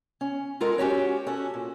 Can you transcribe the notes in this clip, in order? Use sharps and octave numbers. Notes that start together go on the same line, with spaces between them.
C#4
G#3 F4 A4 A#4 F#5
C#4 F#4 G4 C#5
C#4 F#4 A4
A#2